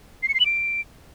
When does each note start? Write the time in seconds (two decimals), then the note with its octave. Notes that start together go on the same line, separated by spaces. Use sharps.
0.23 C7
0.29 C#7
0.34 C7
0.40 F#7
0.46 D7